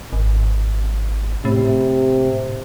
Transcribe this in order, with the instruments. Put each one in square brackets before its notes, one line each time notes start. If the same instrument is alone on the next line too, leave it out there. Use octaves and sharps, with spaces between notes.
[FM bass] G#1
[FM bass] A2 [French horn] C3